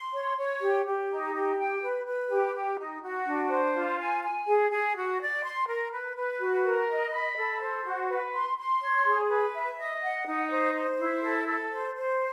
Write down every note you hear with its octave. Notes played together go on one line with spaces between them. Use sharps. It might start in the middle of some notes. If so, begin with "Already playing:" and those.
Already playing: C6
C#5
C#5
G4
G4
D#4
G4
G5
B4
B4
G4
G4
D#4
F#4
D4
C5
F4
G#5
G#5
G#4
G#4
F#4
D5
C6
A#4
B4
B4
F#4
A#4
D#5
B5
A4
C5
F#4
B4
C6
C6
C#5
G#4
B4
E5
D#5
F#5
D#4
C5
C5
E4
A4
A4
C5
C5